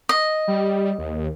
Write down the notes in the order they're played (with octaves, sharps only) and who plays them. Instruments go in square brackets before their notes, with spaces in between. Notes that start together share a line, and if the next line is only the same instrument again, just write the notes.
[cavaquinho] D#5
[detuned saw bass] G3
D#2